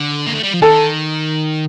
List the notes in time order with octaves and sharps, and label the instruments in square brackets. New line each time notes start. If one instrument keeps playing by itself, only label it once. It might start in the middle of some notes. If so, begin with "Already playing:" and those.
Already playing: [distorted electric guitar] D3
A#3
A3
G3
F3
[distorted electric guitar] D#3 [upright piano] A4